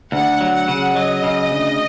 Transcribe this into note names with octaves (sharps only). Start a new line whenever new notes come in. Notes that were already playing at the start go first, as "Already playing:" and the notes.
D2 F#5
F#3
F#5
C#3
F#3 D#5
C#3
D2